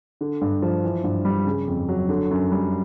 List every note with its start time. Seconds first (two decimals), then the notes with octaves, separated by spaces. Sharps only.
0.21 D3
0.41 G2
0.62 F3
0.84 E3
1.04 G2
1.25 G3
1.47 C#3
1.67 F2
1.89 F#3
2.09 D3
2.31 F#2
2.51 G3